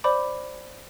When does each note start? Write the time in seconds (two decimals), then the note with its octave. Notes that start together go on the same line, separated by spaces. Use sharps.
0.04 C5 D5 B5 D6